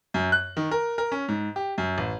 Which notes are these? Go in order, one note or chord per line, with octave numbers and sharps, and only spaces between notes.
F#2
F#6
D#3
A#4
A#4
C#4
G#2
G4
F#2
A1